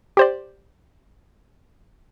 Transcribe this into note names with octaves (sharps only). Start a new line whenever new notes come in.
G4 C5 D5